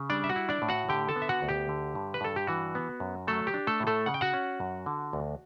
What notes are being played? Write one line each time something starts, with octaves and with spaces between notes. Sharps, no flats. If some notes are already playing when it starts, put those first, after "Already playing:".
Already playing: C#3
G3 D4 D5
E5
F#4 F#5
E4
D4 D5
A2
F#4 F#5
D3 G4 G5
A4 A5
B3
E5
F#4 F#5
D2
G4
D3
G2
B4
G2 A4
G4
E3 F#4
B3
F#2
F#3 A3 A4
G4
D4
A3 A4
A2
A3 A4
C#3 F#5
G5
F#4 F#5
C#4
F#2
D3
D2